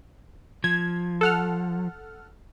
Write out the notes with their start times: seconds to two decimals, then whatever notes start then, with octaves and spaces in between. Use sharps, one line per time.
0.64 F3 G#6
1.21 A4 F#5 F6